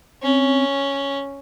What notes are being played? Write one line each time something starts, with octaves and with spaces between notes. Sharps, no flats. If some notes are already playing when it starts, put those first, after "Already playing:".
C4 C#4